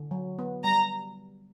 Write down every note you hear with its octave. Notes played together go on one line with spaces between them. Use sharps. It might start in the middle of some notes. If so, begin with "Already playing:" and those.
Already playing: D3
F#3
B3
G3 A#5